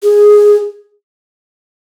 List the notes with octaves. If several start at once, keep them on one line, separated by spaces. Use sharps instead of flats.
G#4